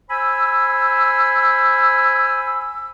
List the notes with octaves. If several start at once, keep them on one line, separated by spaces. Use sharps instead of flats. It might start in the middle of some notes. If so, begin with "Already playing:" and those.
C5 G#5 B5 E6